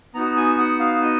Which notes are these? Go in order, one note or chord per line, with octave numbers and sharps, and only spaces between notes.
B3 D#4 F#4 A#5
G#5
F#5
F5
D#5